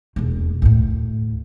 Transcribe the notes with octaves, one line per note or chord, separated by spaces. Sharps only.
E1 D#2
D2 A2